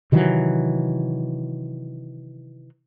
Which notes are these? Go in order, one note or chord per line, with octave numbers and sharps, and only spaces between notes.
C3 D#3 E3 F#3